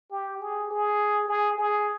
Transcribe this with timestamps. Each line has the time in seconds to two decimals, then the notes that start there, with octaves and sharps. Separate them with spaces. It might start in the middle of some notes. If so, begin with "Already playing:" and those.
0.12 G4
0.41 G#4
0.71 G#4
1.29 G#4
1.58 G#4